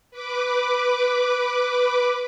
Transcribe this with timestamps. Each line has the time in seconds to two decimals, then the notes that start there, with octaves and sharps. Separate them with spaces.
0.11 B4 D6